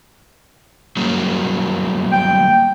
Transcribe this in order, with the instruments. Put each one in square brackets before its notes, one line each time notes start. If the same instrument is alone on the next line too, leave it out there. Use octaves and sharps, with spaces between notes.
[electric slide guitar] F#3 G3 A#3
[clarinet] G5